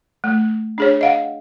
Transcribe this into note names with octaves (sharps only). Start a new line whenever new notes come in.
A3
D4 G#4 C#5
D#5 F5 F#5